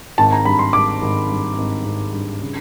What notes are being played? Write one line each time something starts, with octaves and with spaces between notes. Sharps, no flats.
G#1 A5
A#5
G2 B5
C6
G#1 D6
G#1
G2
G#1
G#1
G2
C#3